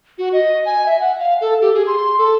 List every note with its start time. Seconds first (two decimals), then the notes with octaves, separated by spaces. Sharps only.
0.18 F#4
0.33 D#5
0.65 G#5
0.86 E5
1.00 F#5
1.19 F5
1.41 A4
1.61 G4
1.74 G#4
1.87 C6
2.18 A4